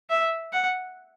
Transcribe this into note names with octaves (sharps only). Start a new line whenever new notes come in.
E5
F#5